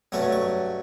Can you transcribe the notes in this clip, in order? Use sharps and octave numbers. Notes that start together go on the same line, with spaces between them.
G2 F#3 A3 C#4 C#6
C#6